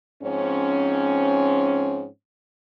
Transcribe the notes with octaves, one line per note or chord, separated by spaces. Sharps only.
G#2 F3 C4 C#4